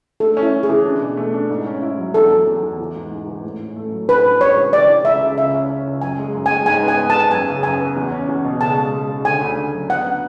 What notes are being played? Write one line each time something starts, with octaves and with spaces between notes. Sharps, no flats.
A3 A4
C#4
E4
C#4
G#4
E3
D4
B2
A3
D4
G#2
C#4
E4
F#3
E2 A4
F#3
E2
E2
E3
G#2
G#2
E3
A2
A2
A3
F#3
A2 B4
D4
G#3 C#5
E3
C#3 D5
E3
C#2 E5
C#3
C#2 E5
C#4
C#4
C#2
F#2 G#5
G#3
F#2
G#3 G#5
G#2 G#5
B3
G#5
B3
A5
B3
F#2 G#5
C#3
F#2 G#5
B3
E2
C#4
E2
B2
C#3 A5
G#3
G#3
C#3
D3 G#5
D2
D2
F#3
B3 F#5
D4